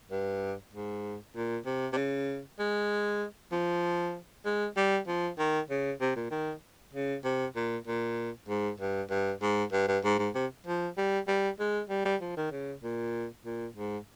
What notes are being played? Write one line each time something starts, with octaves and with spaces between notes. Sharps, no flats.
G2
G#2
A#2
C3
C3
C#3
G#3
F3
G#3
G3
F3
D#3
C#3
C3
A#2
D#3
C#3
C3
A#2
A#2
G#2
G2
G2
G#2
G2
G2
G#2
G#2
C3
F3
G3
G3
G#3
G3
G3
F3
D#3
C#3
A#2
A#2
G#2